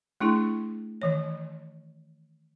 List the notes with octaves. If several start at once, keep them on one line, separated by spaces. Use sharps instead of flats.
A3 D4 E4 G#4
D#3 E3 C#5